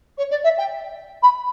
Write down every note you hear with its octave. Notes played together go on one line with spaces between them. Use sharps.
C#5
D5
E5
G5
B5